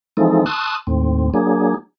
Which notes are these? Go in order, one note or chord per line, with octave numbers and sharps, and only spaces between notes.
E3 F3 G#3 C4 D#4 A4
A5 C6 C#6 D#6 E6 F#6
D#2 A2 C4
F#3 A#3 D4 G#4